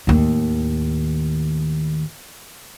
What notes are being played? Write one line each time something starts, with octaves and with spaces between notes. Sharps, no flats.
D#2 A2